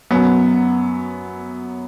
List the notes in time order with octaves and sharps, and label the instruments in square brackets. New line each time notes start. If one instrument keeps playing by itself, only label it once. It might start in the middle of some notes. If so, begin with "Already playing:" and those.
[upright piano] F#2 F#3 B3